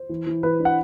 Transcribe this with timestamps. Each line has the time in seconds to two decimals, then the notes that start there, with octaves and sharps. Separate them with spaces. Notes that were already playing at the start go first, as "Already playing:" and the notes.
Already playing: C5
0.09 E3
0.27 E3
0.43 E3 B4
0.60 D4
0.65 F#5